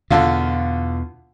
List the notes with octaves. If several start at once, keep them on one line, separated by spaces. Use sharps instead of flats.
E2 B2 D3 F4